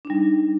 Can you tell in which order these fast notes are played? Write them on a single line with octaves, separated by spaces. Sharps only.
D4 D#4 G3